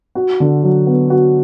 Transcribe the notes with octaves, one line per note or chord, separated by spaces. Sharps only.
F#4
D3
F#3
B3
F#4